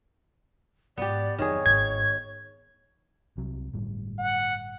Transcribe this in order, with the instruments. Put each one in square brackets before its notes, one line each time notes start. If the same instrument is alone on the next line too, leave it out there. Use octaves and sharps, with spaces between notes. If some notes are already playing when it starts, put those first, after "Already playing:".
[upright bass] G#2 [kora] B3 G4 [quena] D5
[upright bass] F2 F#3 [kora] D#3 G#4 [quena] C#5
[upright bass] G#1 G#2 [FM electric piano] G#6
[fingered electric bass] C2 C3 F#3
G1 A2 G3
[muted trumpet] F#5